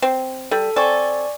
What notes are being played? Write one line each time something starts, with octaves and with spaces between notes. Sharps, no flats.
C4
G3 A4
C4 A4 D5 G#5 C#6